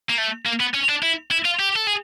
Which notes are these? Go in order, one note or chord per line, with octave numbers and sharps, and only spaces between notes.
A#3
A3
A#3
B3
C#4
D4
E4
E4
F4
G4
A4
G#4